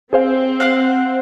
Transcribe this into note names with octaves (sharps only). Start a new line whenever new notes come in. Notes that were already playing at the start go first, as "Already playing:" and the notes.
C4 G#4 C5 F5
C5 F5 F#5 F6 F#6